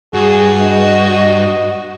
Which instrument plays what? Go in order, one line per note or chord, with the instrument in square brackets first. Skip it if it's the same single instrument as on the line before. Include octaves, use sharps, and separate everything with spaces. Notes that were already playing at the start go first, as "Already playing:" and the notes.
[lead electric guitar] G2 [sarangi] F#4 [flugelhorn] G#4
[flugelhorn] D#5